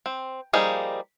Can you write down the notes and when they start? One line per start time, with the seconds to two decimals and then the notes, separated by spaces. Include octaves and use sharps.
0.06 C4
0.53 F3 G3 A#3 D#4 G#4